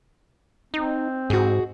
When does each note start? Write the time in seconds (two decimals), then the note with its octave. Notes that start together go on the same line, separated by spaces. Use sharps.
0.74 C4 D#4
1.30 G#2 F#4 G#4